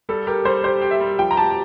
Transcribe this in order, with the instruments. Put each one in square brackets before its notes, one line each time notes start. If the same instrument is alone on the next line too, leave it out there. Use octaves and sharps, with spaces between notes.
[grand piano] G3 [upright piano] A4
[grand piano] G4 [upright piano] A#4
[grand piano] G3 [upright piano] C5
[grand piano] G4 [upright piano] C5
[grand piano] G4
[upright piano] E5
[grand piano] G3
[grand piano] F3 [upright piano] G5
[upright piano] A#5
[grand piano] G4 [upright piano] A5